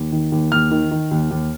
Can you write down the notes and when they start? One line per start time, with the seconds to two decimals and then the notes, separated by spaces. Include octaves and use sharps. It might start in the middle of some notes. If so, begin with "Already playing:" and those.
Already playing: D#2
0.12 D#3
0.32 D#2
0.52 D#2 F6
0.71 D#3
0.91 D#3
1.11 D#2
1.31 D#2